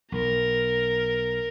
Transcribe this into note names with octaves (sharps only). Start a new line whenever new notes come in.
B1 A#4